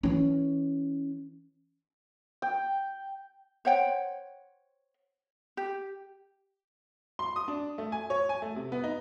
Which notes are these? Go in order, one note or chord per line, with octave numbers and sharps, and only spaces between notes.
E3 C#4
G5
C5 C#5 F#5 G5
G4
C6
D#6
D4
A3
G#5
C#5
G#5
A3
C3
B3
D#4